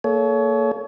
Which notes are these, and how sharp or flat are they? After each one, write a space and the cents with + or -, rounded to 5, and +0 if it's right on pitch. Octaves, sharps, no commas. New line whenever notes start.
A#3 -15 A4 -35 C#5 +25